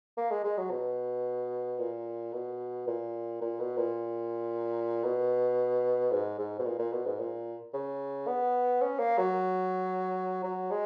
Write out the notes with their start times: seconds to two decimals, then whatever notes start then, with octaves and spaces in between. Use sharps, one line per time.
0.17 A#3
0.31 G#3
0.44 G#3
0.58 F#3
0.71 B2
1.79 A#2
2.33 B2
2.87 A#2
3.41 A#2
3.59 B2
3.77 A#2
5.04 B2
6.12 G#2
6.38 G#2
6.59 B2
6.65 A#2
6.79 A#2
6.92 B2
7.06 G#2
7.20 A#2
7.74 C#3
8.27 B3
8.82 C#4
8.99 A#3
9.18 F#3
10.43 F#3
10.71 G#3